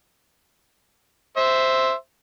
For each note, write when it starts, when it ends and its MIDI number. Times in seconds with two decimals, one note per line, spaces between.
1.37 1.93 72
1.37 1.93 76